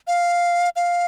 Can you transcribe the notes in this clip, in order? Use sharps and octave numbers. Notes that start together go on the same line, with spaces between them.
F5
F5